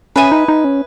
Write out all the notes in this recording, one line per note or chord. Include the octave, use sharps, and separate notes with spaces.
C#4 B4 E5 G#5 D#6
D#4
D#4
C#4